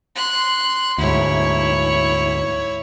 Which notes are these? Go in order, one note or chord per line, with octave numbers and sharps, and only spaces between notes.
C6 F#6
D2 G#2 E4 C#5